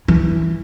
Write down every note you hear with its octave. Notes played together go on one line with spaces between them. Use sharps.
E3